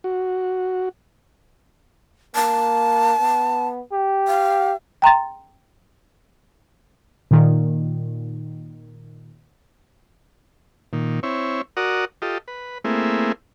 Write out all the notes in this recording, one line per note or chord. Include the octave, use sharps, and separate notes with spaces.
F#4
A#3 A5
B3
G4
F5
G5 A#5 C6 A6
A#2 D#3
A#2 D#3
C4 E4 C#5
F#4 A#4 D5 F#5 D#6
F4 G4 A4 D#5
B4
A3 A#3 C4 E4 G#4